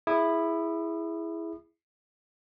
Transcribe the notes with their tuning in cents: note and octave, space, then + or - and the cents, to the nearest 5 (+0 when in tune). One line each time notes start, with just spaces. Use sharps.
E4 +0 G#4 +0 D#6 -40